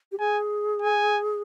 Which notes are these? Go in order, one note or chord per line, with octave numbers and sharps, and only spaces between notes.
G4
G#4 G#5
G#5